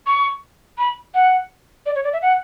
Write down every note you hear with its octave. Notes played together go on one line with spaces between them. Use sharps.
C#6
B5
F#5
D5
C#5
D5
E5
F#5